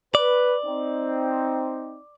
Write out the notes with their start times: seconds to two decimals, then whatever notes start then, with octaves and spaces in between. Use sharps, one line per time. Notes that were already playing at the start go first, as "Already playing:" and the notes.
0.15 B4 D5
0.65 C4 D#4